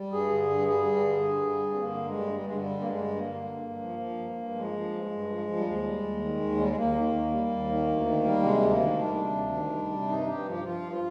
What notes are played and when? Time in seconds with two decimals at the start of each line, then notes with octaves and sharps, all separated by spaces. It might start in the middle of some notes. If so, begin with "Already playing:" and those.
Already playing: G3
0.12 G2 G#4
0.31 D3
0.49 G2
0.67 G3 G#4
0.85 G2
1.04 D3
1.22 G2
1.41 G3
1.60 G2
1.75 C4
1.78 D3 A#3
1.97 G2
2.06 G#3
2.16 G3
2.34 G2 G3
2.45 G#3
2.52 D3
2.57 G3
2.70 G2
2.80 A#3
2.89 G3 G#3
3.08 G2
3.17 A#3
3.26 D3
3.45 G2
3.63 G2
3.81 F3
3.99 F3
4.18 G2
4.37 G2
4.55 F3 G#3
4.73 F3
4.92 G2
5.10 G2
5.28 F3
5.47 F3
5.56 G3
5.65 D#2 G#3
5.84 G3
6.02 D#2
6.21 D#3
6.40 D#2
6.58 G3
6.68 G#3
6.77 D#2 A#3
6.95 D#3
7.13 D#2
7.32 G3
7.50 D#2
7.69 D#3
7.87 D2
8.06 D#3
8.24 G3
8.43 C3 G#3
8.61 D2
8.71 A#3
8.80 D#3
8.98 G3 D4
9.16 C3
9.35 D2
9.53 D#3
9.72 G3
9.91 C3
10.09 G2 D#4
10.27 G2 G4
10.45 F3
10.52 G4
10.64 F3 F4
10.83 G2
10.92 F4